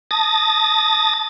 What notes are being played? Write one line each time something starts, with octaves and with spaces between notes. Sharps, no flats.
A5 D#6 A6 A#6